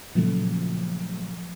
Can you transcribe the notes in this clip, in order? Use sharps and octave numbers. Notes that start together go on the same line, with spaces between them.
A#2 C#3 F3 F#3 A3